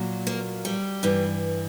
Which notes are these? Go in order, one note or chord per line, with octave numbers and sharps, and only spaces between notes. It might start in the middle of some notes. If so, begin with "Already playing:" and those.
Already playing: A#2 F#3
A#3
G3
G2 E3